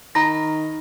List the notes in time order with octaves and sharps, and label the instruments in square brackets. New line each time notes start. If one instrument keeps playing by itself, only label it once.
[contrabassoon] D#3 [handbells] A#5 B5 A#6